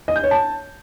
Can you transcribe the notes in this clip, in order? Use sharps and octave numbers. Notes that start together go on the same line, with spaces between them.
D#5
G6
C#5
A5